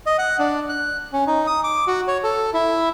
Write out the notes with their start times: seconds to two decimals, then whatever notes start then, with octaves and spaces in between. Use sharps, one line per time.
0.06 D#5
0.18 F#5
0.39 D4
0.69 F#6
1.13 C#4
1.27 D#4
1.47 D#6
1.64 D6
1.87 F#4
2.08 C#5
2.24 A4
2.54 E4